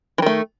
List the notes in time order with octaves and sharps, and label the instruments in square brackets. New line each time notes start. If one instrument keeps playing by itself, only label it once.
[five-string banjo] E3
D#3
A3